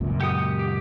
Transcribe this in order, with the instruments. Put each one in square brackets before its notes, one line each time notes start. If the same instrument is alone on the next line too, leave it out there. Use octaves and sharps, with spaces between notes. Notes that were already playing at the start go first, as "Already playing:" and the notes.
[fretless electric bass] C#2 F#2 A#2
[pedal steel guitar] G4 F#5 D#6
G4